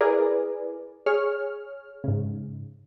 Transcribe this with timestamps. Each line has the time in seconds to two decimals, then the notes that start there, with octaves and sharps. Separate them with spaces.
0.01 E4 G#4 A#4 B4 D5
1.06 G#4 C#5 F6
2.04 G#2 C#3